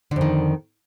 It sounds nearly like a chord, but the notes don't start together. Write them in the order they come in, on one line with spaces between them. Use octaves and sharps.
D3 F2 D#3